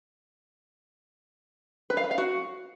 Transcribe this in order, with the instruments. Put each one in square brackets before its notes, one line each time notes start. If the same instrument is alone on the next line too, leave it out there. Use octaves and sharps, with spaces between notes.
[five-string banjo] B4
F5
B4
F5
F#4